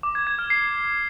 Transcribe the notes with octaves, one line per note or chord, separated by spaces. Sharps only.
D6
G#6
G#6
F6
C7